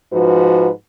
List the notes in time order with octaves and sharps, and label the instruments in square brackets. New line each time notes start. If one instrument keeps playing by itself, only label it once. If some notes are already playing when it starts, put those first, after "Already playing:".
[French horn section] G#2 F3 F#4 B4